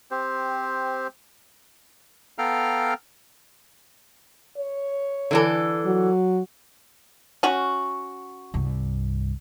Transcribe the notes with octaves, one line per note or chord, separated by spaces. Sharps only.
C4 G4 C5
B3 A4 F5 G5 A#5 F6
C#5
D3 E3 A4
F#3
C#4 F#4
C2 G2